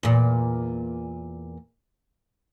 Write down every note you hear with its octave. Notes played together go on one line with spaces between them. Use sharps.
E2 A#2